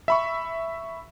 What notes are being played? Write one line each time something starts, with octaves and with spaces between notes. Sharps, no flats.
E5 B5 C#6